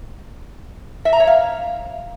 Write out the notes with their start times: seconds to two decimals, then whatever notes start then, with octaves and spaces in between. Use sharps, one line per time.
1.05 E5
1.13 A#5
1.20 C#5
1.27 F5